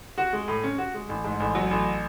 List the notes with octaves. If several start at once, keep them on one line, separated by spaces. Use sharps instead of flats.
F#4
G#3
A2
C#4
F#4
G#3
A1
G#2
A1
F#3
A1